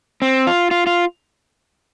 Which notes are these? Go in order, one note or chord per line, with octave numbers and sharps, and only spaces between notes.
C4
F4
F4
F4